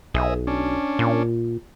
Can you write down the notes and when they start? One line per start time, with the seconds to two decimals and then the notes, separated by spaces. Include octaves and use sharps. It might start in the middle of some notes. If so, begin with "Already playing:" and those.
0.14 B1 G#4 D#5 E5
0.47 C#4 D4
0.99 A#2